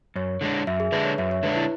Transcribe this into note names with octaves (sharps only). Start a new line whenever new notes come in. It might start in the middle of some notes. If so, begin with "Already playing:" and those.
F#2 C#5
D3 G#3 D4
F#2 E5
G#4
D3 G#3 D4 B4
C#5
F#2 E5
C#5
D3 G#3 D4 B4
E4